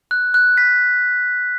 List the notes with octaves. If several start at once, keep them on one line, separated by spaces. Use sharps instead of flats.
F#6
F#6
B6